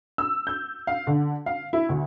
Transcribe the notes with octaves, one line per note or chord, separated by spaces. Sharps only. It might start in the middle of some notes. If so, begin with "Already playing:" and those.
E6
G6
F5
D3
F5
E4
D2